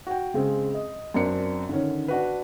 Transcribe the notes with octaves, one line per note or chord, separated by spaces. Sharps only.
F#4 G5
C#3 G#3 C4
D#5
F#2 C4 D4 A#4 C#7
D3 D#3 C#4
D4 F#4 B4